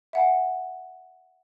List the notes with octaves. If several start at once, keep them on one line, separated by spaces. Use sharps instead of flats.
E5 F#5 G#5